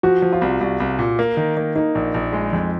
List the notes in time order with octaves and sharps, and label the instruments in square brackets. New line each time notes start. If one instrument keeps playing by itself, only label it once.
[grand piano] F3 [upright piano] F#4
[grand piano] F3
[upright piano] F4
[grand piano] C2
C2
C2
A#2
A#3
D#3
A#3
[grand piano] A#3 [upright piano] D#4
[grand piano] A#1
A#1
G#3
F2